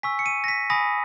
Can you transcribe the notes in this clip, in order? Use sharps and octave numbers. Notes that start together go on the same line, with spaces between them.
G#5 C#6 E6 B6
C#7
D#7
A#6
B6
G#5 B5 D#6 A#6